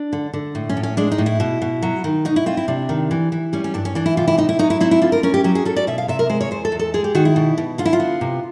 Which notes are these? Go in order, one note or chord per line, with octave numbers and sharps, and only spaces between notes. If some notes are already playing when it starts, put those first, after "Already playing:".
Already playing: D4
D3
D3
A2
C#4
A2
C#4
G#3 D4
D#4
A2
E4
B2
B2
F#3
D#3
B2 D#4
E4
C4 F4
E4
C3 D4
D#3
E3
E3
G3 C#4
C#4
G2 D4
C#4
E3 D4
E4
C3 F4
E4
A2 D#4
E4
F#3 D#4
E4
C4 E4
E4
D3 F4
A#4
C#4 A#4
G4
F#3 G4
G#4
C#4 A4
D5
B2 E5
F5
C3 E5
A#4
G#3 C5
C#5
E2 C5
A4
E2
A4
G#3 G#4
G4
D#3 F#4
E4
B2
B2
D3 F4
E4
F4
B3
C3